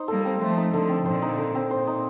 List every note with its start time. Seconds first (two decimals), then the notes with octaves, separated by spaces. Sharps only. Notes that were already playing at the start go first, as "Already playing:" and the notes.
Already playing: D#4 C5
0.08 G3 A#3 A4
0.25 C4
0.41 F3 A3 C5
0.57 D#4
0.74 D3 F3 A4
0.89 C4
1.05 A#2 D3 C5
1.22 D#4
1.38 A4
1.55 C4
1.71 A#2 C5
1.87 D#4